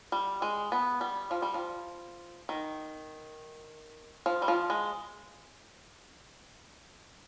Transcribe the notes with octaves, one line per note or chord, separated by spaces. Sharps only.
G3
G#3
B3
G3
F3
G3
F3
D#3
F3
G3
F3
G#3